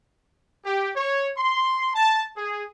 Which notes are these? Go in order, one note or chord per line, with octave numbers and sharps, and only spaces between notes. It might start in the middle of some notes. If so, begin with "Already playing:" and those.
G4
C#5
C6
A5
G#4